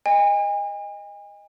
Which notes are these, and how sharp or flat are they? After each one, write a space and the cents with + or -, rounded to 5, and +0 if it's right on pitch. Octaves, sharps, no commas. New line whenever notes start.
D#5 +0 G#5 -40